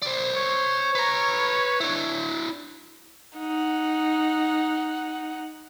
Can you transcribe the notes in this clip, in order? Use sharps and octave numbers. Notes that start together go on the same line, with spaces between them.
C5 D5
C#5
B4 A#5
D4 E4
D#4 F#5